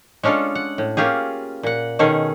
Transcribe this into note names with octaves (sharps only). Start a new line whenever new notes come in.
G#3 C#4 D4 F4 A4
F#5
A2
A#3 C#4 F4 G4 G#4
A#2 F#5
B2 D#3 C#4 G#4 A4